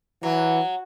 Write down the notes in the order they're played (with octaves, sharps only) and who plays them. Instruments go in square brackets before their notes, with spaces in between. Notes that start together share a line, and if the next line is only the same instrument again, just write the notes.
[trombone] E3 [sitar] F#3 [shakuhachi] F#5